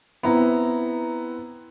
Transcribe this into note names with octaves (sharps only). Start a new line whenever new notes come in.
B3 C4 E4 A#5